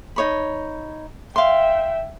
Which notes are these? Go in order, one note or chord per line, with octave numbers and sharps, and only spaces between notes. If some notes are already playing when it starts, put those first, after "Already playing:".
D#4 C#5 B5
E5 F5 G5 C6